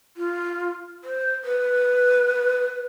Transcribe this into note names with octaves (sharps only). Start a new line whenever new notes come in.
F4
C5
B4